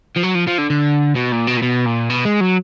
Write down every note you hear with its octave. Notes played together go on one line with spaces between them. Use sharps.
F3
F#3
F3
F3
D3
D3
B2
A#2
B2
A#2
B2
A#2
B2
G#3
F#3